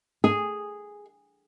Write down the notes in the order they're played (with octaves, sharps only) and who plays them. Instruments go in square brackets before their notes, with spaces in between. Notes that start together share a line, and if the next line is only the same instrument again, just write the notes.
[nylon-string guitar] G#4